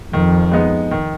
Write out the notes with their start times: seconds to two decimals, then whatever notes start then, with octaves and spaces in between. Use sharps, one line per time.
0.13 F2 D#3
0.51 G#3 B3 D#4
0.91 D#3